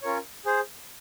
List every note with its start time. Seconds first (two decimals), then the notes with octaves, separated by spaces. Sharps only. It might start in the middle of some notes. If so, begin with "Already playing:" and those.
0.02 C#4 F4 A#4 C#5
0.46 G#4 C5